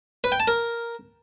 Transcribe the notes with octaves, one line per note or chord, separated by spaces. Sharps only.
B4
G5
A5
A#4